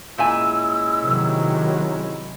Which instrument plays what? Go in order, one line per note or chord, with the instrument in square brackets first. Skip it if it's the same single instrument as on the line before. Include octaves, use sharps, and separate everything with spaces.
[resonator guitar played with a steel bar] A#2 E5 G#5 [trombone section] G#3 C#4 E4 [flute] E6
[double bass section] C3 D#3 F#3